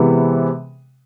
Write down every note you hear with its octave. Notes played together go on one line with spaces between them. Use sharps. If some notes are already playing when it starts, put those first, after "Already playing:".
Already playing: C3 E3 G#3 B3